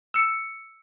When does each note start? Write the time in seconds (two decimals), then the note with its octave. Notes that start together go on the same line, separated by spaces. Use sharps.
0.14 E6 C#7